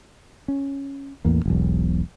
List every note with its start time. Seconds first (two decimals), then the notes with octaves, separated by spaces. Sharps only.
0.48 C#4
1.25 A1 E2 A#3
1.46 E1 B1